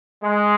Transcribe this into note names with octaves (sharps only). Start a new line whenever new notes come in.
G#3